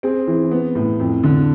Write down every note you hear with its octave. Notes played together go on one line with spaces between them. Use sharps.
C4 G#4
E3
B3
A2
F2
D3